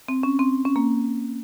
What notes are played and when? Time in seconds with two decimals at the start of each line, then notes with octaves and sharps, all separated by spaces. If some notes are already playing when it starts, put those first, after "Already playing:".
0.08 C4
0.23 C#4
0.39 C4
0.65 C#4
0.76 A#3